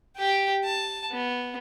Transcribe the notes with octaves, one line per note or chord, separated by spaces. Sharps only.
G4 G5
A5
B3